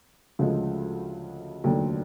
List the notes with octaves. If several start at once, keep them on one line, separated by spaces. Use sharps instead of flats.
D2 C#3 F3 G#3
F1 D#2 D3 F#3